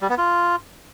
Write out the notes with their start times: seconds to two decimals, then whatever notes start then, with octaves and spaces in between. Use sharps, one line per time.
0.01 G3
0.09 B3
0.18 F4